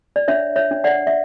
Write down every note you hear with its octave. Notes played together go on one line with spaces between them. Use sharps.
D5
D4 C#5 E5
C#5 E5
D4
D5 F#5
E5